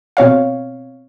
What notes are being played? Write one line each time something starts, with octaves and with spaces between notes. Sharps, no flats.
B2 C4 C#5 F5